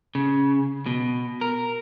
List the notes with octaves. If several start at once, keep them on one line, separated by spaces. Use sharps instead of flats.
C#3
B2
A#4